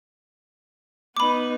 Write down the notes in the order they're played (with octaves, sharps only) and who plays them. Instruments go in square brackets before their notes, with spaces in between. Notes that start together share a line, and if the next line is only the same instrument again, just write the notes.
[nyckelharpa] B3 D#4 [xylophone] B5 D6